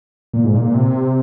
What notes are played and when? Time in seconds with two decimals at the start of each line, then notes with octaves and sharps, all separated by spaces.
0.34 A#2
0.44 G#2
0.54 A#2
0.65 A#2
0.74 C3